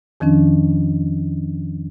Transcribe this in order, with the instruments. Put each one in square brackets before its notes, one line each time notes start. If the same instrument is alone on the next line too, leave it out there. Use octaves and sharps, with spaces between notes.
[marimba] F2 D#3 F3 C#4 D4